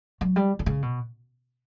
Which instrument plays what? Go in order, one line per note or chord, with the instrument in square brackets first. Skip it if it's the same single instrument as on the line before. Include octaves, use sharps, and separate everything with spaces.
[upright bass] F#3
G3
D3
C#3
B2